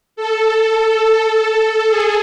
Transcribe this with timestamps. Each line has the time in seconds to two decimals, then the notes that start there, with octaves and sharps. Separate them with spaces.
0.16 A4
1.89 G#4